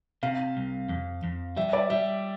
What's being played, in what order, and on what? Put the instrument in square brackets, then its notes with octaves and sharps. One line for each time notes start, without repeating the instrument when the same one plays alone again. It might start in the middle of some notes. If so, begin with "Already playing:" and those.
[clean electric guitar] C3 [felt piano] F5
[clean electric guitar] C2
F2
F2
[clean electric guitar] G3 [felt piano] E5
[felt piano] D5
[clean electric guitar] G3 [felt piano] E5